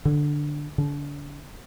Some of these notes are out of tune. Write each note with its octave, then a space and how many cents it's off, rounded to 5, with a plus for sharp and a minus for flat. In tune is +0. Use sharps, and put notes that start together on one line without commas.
D3 +5
D3 -35